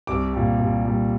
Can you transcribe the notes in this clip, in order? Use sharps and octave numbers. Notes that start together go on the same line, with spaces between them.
C2 D6
A#2 G3
C2
A#2 G3